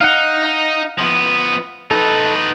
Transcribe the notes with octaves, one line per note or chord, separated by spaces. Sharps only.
D#4 F5 F#5
D#4
F3 B3
D#4 A4 B4